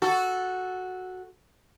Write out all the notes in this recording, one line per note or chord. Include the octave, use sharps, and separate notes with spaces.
F#4 A4